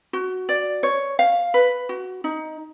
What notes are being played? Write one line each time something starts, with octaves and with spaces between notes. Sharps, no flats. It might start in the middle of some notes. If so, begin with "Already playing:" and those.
F#4
D5
C#5
F5
B4
F#4
D#4